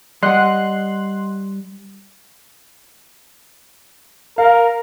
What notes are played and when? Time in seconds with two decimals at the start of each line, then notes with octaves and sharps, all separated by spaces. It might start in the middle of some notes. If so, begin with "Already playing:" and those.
0.23 G3 D#5 F#5 C6 F#6
4.38 A#4 F5